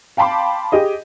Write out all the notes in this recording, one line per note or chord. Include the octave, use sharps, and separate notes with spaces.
F5 G5 A5 B5 C6 D6
G4 G#4 D#5